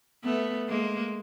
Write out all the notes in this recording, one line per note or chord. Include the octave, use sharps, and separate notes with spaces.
A3 B3
G#3 A#3